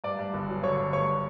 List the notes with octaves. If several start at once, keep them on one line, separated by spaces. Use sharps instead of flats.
G2 D5 D6
G2
G1
F#3
D3 C#5 C#6
D3
G2 C#5 C#6